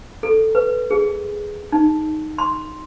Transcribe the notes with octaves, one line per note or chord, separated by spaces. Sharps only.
A4
B4
G#4
D#4
C6